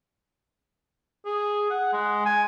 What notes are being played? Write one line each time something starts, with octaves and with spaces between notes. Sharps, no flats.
G#4
F#5
G#3
G#5